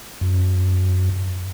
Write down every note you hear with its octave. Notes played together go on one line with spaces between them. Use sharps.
F#2